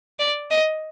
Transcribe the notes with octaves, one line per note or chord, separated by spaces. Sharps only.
D5
D#5